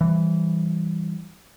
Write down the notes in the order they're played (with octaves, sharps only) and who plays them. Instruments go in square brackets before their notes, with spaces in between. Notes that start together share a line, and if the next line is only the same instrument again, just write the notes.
[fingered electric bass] E3 G3